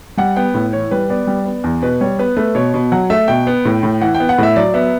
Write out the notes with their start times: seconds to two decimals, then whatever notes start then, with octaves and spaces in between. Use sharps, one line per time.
0.17 G3 F#5
0.36 B3 G5
0.54 A2
0.73 E3 C#5
0.91 G3 B4
1.10 B3 D5
1.27 G3
1.45 B3
1.64 E2
1.82 B2 B4
2.01 G3 C#5
2.19 B3 B4
2.36 A3 B4
2.55 B2 C#5
2.74 B2
2.92 F#3 F#5
3.10 A3 E5
3.28 B2 G5
3.47 B3
3.65 A2
3.83 A2
4.01 E3 F#5
4.14 G5
4.20 B3
4.29 F#5
4.38 A2 E5
4.56 F#3 D5
4.74 B3 E5